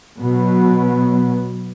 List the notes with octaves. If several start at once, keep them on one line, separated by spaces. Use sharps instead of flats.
B2 F#3 B3